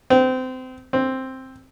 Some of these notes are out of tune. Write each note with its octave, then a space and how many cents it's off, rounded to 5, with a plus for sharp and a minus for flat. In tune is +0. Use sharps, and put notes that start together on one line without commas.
C4 -25
C4 +5